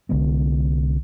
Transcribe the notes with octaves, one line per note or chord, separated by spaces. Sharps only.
C2 D3 G#3 B3